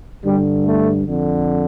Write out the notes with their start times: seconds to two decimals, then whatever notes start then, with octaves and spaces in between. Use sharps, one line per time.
0.24 G2 D3 G3
0.66 A3
1.07 F2 D3